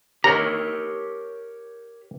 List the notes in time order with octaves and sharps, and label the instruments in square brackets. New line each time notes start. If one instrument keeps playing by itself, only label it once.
[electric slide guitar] G4 A#4 C#5 [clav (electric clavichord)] A#5